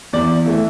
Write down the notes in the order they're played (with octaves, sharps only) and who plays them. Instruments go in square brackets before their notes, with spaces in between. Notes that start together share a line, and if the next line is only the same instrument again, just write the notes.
[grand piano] E2 D5
E3 A3